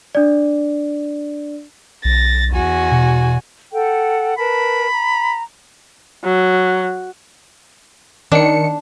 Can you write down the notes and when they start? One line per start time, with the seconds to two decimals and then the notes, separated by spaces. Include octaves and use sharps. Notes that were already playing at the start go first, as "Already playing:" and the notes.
0.15 D4 D5
2.05 B1 A6 A#6
2.53 E2 F#4 G#5
2.92 B2
3.73 A4 F#5 G5
4.38 A#4 B4 A5 B5
4.91 A#5
6.24 F#3
8.32 D#3 D4 C#7